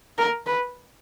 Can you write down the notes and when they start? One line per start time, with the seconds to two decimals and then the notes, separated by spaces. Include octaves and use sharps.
0.18 A#4
0.46 B4